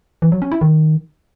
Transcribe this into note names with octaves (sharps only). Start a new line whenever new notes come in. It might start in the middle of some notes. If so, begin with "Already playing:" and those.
E3
F#3
C#4
E4
D#3